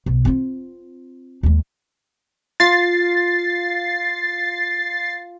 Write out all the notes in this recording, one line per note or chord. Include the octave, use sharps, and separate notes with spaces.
B1
C4 F4
D#2 G#3
F4 A6 C7